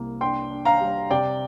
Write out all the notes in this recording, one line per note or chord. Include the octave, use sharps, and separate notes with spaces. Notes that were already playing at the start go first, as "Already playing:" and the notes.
Already playing: C2 A#3
D4 G5 C6
D4
F5 A#5
G3
C3 D5 G5